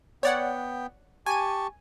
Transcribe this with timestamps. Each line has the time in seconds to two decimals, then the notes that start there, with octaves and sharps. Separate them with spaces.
0.23 B3 C#5 D5 F#5 G5
1.26 G4 G#5 A5 C#6 D#7